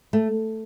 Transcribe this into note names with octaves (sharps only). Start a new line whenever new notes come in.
A3